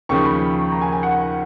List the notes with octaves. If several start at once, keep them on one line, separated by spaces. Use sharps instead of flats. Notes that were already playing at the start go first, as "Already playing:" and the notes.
D#2 C#3 F3 C#6
B5
A#5
G#5
G#5
F#5